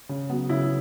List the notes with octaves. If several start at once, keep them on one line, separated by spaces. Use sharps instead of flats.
C#3
F#3 B3
C#3 E4